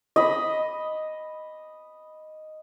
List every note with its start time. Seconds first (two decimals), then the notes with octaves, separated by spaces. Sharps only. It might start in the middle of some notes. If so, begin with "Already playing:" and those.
0.16 D#5 B5